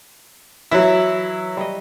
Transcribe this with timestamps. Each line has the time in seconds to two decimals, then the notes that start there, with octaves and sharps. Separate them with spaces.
0.71 E3 F#3 E4
1.57 G3 D#5